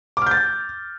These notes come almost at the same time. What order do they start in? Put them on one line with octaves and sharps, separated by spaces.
D6 F6 G6 A6